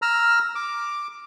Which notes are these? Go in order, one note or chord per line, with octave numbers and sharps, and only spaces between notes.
A#5 E6 F6
D6